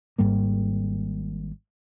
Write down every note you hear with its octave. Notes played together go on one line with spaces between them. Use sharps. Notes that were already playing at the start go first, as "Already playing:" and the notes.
G#1 G#2 G3 A#3